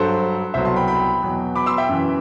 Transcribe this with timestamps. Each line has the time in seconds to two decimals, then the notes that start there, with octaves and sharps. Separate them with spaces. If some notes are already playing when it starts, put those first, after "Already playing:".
Already playing: G2 F#3 A4 C5
0.54 C2 B2 F#3 C5 E5
0.65 A5 C6
0.76 G5 B5
0.88 G5 B5
1.22 E2 B2 F#3
1.56 B5 D6
1.66 C6 E6
1.78 E5 G5
1.89 F#2 E3